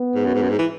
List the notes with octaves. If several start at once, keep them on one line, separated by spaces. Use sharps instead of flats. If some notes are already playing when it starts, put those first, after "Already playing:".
Already playing: B3
G#2
F#2
G#2
F#2
G#2
E3